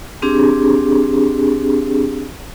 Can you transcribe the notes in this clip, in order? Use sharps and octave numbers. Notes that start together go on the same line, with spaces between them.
C4 D4 G4 G#4